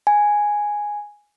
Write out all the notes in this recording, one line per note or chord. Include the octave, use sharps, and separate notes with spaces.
G#5